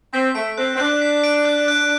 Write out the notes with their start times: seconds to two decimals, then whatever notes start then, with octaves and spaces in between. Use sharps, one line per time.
0.13 C4 B6
0.35 A3 D7
0.58 C4 F#6
0.75 C4
0.79 D4 F#6
1.02 B6
1.24 D7
1.45 F#6
1.68 F#6